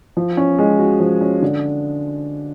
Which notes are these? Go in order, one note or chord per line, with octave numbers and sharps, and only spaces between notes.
F3
C#4
G#3
F#4
F3
C#4
D3